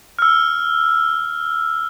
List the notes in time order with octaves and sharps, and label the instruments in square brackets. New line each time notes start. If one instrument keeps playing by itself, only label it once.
[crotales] E6 F6